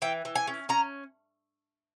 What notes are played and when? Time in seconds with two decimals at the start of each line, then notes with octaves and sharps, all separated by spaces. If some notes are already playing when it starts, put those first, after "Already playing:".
0.02 E3 G5
0.25 E3
0.35 G#5
0.48 C#4
0.69 C#4 A#5